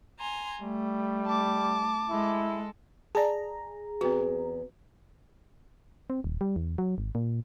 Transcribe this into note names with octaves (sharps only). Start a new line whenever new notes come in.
G#5 A#5 C6
G3 A3
A5 D6
G#3 E4 A4
G#4 D5 A5 A#5
E2 C4 F#4
C4
D#1
G3
E2
F#3
G#1
A#2